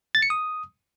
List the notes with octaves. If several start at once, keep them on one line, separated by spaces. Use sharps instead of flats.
A6
C#7
D#6